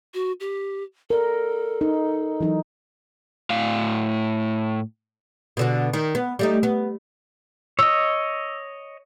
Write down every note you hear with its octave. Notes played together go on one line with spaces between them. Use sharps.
F#4
G4
A4 A#4 D5
D#4
E3 F#3 D#4
A2 F5
B2 D3 F#4
D#3
B3
G3 A3 D#4
B3
C#5 D#5 E6